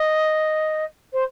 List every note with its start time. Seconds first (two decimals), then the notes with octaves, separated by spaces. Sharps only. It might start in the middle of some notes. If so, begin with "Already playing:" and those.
Already playing: D#5
1.12 C5